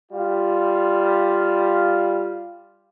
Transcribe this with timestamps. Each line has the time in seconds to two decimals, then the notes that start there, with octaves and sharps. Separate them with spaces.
0.11 G3 F4